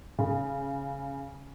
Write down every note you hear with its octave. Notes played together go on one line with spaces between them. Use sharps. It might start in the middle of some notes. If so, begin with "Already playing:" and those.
C#3